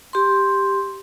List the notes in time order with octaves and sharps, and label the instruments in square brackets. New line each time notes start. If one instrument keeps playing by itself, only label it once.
[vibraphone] G4 C6